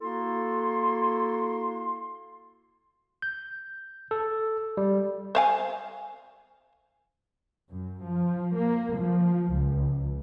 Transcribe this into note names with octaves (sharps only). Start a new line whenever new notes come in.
A#3 E4 F#4 A4 C6
G6
A4
G3
C5 F5 G#5
F#2
F3
A#3
F3
C#2